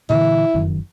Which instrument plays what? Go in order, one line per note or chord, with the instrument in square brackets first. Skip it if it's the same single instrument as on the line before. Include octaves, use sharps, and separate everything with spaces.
[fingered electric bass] A#2 D3 E3 [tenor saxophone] E4
[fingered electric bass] F1 F#2 D#3